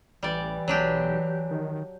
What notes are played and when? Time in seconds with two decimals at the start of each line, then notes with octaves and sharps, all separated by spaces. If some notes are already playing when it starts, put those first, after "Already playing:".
0.23 A1 E3 G3 D5
0.68 B1 F#3 D4 G4
1.51 D#3